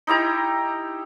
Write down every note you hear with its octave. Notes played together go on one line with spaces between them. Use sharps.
D#4 E4 G4 A#5